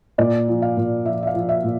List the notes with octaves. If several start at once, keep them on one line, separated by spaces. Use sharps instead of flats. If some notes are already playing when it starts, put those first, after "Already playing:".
A#2 D5
F3
F5
A#2
F3 E5
E5
F5
F3
E5
A#2